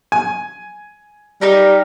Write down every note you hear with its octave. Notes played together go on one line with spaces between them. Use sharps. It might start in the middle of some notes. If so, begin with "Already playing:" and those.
G#5
G3 D#4 G4 A#4